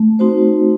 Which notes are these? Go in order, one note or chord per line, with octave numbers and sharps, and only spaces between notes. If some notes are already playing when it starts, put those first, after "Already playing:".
Already playing: A3
C4 D#4 F#4 C5